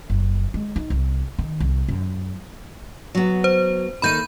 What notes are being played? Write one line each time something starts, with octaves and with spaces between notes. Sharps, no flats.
F#1
G#3
D#4
C2
D#3
C2
F#2
F#3 B3
C5
D#2 D#3 A3 B5 G6 D#7